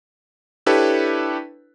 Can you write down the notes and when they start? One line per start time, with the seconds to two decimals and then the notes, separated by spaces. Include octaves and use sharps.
0.66 D4 E4 G4 A4 B4 C#5